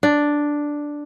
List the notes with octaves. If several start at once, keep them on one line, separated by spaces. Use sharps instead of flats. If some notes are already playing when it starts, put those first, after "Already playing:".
D4